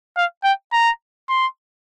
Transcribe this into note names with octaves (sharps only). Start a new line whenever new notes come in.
F5
G5
A#5
C6